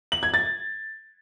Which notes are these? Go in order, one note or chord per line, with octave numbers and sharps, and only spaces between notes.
F#7
G#6
A6